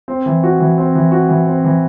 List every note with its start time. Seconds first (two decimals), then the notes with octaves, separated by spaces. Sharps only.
0.08 C4
0.26 E3
0.43 F#4
0.60 E3
0.78 C4
0.95 E3
1.12 F#4
1.29 E3
1.47 C4
1.64 E3